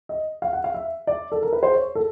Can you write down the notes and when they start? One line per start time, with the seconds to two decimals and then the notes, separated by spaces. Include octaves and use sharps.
0.09 D#5
0.42 F5
0.53 F#5
0.64 F5
0.74 E5
1.07 D5
1.32 A4
1.42 A#4
1.53 B4
1.63 C5
1.74 C#5
1.95 A4